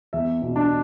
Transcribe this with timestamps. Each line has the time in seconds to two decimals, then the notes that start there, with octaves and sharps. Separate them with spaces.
0.13 E2 E5
0.42 B2
0.56 D4